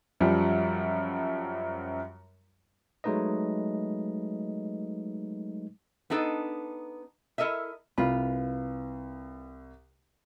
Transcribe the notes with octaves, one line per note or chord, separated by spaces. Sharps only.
F#2 F3 G3
F#3 G#3 A3 D#4 B4 D#5
B3 D4 D#4 A4 D#5
E4 A4 A#4 D#5 E5
C2 F4 B4